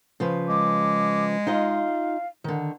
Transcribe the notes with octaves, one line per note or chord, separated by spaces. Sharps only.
C#3 F3 B4
G#3 D6
D#4 F4 D#5 F5
D3 D#3